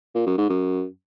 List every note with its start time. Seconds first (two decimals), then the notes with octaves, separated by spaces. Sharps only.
0.15 A#2
0.26 F#2
0.38 G#2
0.49 F#2